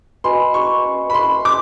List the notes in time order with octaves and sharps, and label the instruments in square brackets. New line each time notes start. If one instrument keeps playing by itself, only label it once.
[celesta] F#4 B4 D#5 G#5 B5 [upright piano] C6
[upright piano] C#6
B5
C6
D6